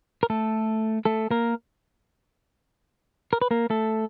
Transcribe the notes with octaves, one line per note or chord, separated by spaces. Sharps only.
A#4
A3 A4
A3 A4
A#3 A#4
A#4
B4
A#3 A#4
A3 A4